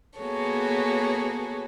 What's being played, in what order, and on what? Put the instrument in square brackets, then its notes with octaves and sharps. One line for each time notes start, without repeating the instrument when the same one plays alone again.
[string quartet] A#3 B3 F#4 G#4 A4 C#5